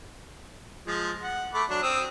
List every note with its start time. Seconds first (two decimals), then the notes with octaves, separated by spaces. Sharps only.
0.87 F3 G#3
1.23 F#5
1.54 A3 B5 D6
1.69 F#3 D4
1.83 C4 D#6 E6